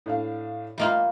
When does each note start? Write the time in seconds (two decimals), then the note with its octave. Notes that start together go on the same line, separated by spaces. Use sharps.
0.06 A2 D4 F5
0.78 G3 A#3 F4 D#5 E5